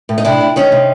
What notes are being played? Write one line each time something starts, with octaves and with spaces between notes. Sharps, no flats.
A2
D#4
C3 D4 E4
C3
D#3 C#4 D#4
C3